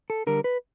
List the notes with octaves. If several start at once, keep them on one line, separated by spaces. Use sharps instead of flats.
A4
D3 G3 A#4
B4